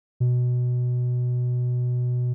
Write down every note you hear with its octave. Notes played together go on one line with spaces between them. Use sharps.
B2